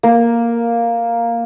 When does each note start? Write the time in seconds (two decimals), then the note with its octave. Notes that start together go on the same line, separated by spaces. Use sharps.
0.03 A#3